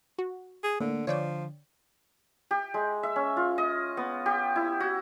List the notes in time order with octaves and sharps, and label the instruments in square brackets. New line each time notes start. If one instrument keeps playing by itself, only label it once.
[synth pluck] F#4
[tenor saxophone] G#4
[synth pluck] A2 [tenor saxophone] D3 [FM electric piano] A#3
[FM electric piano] D3 [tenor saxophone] F3 [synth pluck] C#5 D5 G5
[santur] G4
G#3
E5
C#4
F4
D#5
B3
G4
E4
F#4